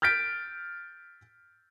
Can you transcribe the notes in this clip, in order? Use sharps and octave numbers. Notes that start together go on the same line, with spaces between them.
F6 G6 A6 B6 D7